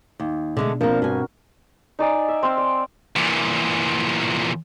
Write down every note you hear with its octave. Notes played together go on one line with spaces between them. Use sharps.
D#2
B2 D3 G#3 A3 D4
F3 A#3 C4 D4 A#4
G2 F#4 G#5
D#4 D5 G#5
E5
C4 F5 E6
D5 G5
E2 A#2